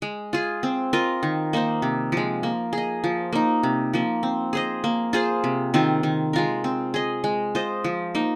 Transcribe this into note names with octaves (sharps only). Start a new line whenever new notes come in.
G#3
F4 G#4
C4
F4 A#4 D#5
D#3
A#3 D#4 C5
C3
F3 G#3
A#3
G#4 D#5
F3
A#3 D#4
C3
F3 A#3
C4
G#4 C5 D#5
A#3
F4 G#4 C5
C3
D#3 C4 F4
D#3
G#3 F4 A#4
C4
G#4 D#5
G#3
F4 C5 D#5
F3
A#3 D#4